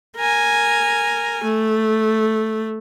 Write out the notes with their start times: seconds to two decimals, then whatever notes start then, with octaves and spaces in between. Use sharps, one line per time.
0.17 A#4 G#5
1.44 A3